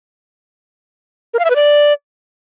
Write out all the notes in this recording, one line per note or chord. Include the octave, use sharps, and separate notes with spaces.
A#4
F5
E5
B4
D5